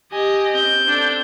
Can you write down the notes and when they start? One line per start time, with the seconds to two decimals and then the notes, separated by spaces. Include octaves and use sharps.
0.12 G4 D#5 G#5
0.52 C4 G6
0.88 D4 A4